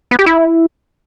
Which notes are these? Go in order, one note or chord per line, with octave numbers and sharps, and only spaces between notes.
B3
G4
E4